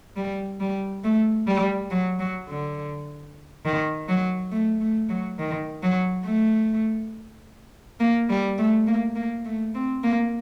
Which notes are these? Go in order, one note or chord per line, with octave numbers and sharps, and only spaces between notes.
G3
G3
A3
G3
F#3
F#3
D3
D#3
F#3
A3
A3
F#3
D#3
F#3
A3
A#3
G3
A3
A#3
A#3
A3
C4
A#3